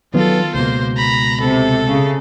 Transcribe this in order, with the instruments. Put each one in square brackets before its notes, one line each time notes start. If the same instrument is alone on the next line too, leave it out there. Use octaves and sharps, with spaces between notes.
[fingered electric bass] D#3 F#3 B3 [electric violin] F4 A4
[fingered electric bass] C#2 B2 [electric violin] A#3 C5
[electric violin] A#5 B5
[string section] C3 [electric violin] A4
[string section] C#3